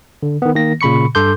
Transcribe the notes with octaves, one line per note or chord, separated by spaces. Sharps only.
D3
D#3 B3
D#3 A#3 A#6
A#2 C#3 B5 C#6 C#7
G2 A4 C6 D6 G6